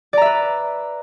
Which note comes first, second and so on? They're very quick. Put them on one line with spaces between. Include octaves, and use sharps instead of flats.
D5 A#5 E5 B4